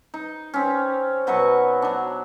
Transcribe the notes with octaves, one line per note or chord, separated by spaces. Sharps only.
D#4
C4 C#4
B2 F#3 D#5 C#6
F#3 D4